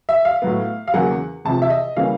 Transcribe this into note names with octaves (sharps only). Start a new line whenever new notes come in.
E5
F5
A2 F#3 B3
F5
E2 C#3 F#3 A#3 F#5
E2 C3 F3 A5
E5
D#5
C#3 E3 G3 A#3 C#4 F5